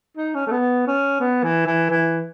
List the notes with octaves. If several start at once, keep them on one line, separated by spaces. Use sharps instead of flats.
D#4
C#4
A3
B3
C#4
B3
E3
E3
E3